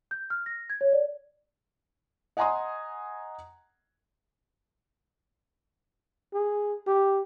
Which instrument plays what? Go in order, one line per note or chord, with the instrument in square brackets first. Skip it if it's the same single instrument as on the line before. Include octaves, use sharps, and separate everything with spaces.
[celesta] G6
F6
A#6
G#6
C#5
D5
[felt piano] D#5 F#5 G#5 A#5 C6 D#6
[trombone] G#4
G4